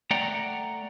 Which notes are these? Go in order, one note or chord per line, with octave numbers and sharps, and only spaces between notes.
A3 D5 F#5 G5 A#5